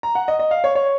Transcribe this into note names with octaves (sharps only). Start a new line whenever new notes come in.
A#5
F#5
D#5
D#5
F5
C#5
C#5